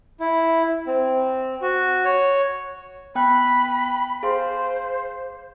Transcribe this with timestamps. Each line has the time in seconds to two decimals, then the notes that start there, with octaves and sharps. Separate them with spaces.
0.20 E4
0.87 C4
1.61 F#4
2.05 C#5
3.15 B3 G5 B5 F#6
4.23 G#4 C5 F5 C6